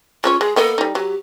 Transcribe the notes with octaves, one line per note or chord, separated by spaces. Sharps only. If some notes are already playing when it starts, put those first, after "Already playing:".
G#3 C#4 F4 C#5
G#3 G#4
A#3 B3 A4 D#5
G3 D#4
F#3 G4